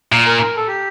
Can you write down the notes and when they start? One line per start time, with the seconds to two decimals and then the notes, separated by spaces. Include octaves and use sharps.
0.12 A#2
0.27 A#4
0.57 A4
0.68 G4